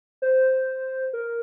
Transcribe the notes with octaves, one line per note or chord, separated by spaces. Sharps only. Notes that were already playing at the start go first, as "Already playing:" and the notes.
C5
A#4